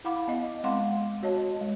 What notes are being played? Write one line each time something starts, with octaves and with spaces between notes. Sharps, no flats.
E4 F5 F#5 B5 D6
B3 D#5
G#3 C4 F5 F#5 C6 D6
F#4 C#5 D#5 A5
G#3